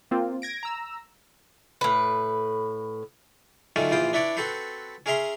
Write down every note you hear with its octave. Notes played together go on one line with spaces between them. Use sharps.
A#3 C4 F4
G#6 A#6 D7
A#5 E6
A2 B4
D3 D#3 F#3 A3 C#4 F4
A#1 E3 F4 C5 G5 D#6
D4 E4 B4 C#5 D5
C4 F#4 A4 B4 C5
C#4 G#4 A#4 E5 A#5 C6